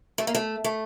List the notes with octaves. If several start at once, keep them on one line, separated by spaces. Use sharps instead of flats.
A3
A#3
A3
A3